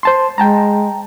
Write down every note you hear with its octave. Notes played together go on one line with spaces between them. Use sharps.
C5 A5 C6
G#3 G5 A5 A#5